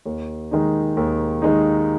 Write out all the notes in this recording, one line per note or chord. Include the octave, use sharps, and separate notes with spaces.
D#2
D#3 G#3 D#4
D#2
D#3 G#3 D#4